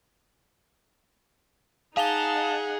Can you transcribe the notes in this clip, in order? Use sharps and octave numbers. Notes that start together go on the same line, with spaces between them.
D#4 G#4 F5 F#5 A5 F7 G7